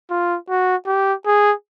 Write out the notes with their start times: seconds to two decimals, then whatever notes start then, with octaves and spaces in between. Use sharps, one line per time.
0.10 F4
0.49 F#4
0.86 G4
1.26 G#4